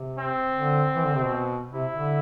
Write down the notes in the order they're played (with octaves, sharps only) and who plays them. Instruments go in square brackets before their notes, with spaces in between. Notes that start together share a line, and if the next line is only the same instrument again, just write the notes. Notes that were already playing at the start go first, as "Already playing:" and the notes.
Already playing: [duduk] C3
[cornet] C4
[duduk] D3
E3
D3
C3
B2
[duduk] C3 [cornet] E4
[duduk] D3